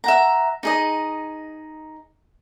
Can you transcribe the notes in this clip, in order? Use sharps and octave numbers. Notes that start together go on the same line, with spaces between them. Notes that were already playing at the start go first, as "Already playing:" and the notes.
E5 F#5 A#5
D#4 G#4 D#5